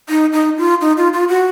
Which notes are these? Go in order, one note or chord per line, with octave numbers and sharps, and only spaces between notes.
D#4
D#4
F4
D#4
F4
F4
F#4